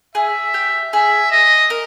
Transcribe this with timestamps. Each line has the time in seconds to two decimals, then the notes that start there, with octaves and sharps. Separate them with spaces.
0.15 G#4 E5
0.54 G4
0.93 G#4 E5
1.31 D#5
1.70 A#4